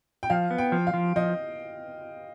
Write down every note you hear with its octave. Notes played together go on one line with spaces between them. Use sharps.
G5
F3 F5
B3
G5
F3
F5
F3
F3 D#5